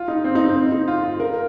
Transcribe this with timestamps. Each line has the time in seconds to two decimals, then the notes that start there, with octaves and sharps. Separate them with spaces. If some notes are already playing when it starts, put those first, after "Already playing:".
Already playing: F4
0.08 D#4
0.24 C4
0.35 D#4
0.45 C4
0.56 C4
0.72 D#4
0.88 F4
1.03 F4
1.20 A#4